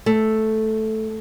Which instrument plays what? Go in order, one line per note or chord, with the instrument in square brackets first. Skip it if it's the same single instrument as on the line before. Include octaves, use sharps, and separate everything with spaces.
[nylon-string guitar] A3